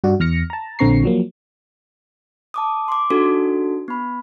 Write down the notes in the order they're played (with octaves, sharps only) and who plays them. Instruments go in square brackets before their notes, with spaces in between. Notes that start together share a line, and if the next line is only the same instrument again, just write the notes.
[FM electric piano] G2 F#4 D5
E2 F6 A#6 C#7
A5 A#5
A#1 D3 C4 A#5 C#6 C7
F3 F#3 A#3
[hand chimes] A5 D6 D#6
C6 D6
D4 D#4 F#4 A4
B3 B5